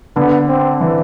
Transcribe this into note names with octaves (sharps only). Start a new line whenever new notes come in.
D3 B3
C4
E3